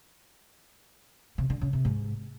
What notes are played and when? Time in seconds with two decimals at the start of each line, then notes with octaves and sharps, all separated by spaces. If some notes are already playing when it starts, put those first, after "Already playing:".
1.38 C3
1.50 D3
1.61 C#3
1.73 C3
1.85 G#2